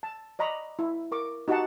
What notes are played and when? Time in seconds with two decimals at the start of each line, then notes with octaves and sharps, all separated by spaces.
0.03 A5
0.39 D5 D#5 A#5 B5 C#6 D6
0.79 E4
1.12 A#4 C#6 D6
1.48 D#4 F#4 G4 D#5 F#5 A5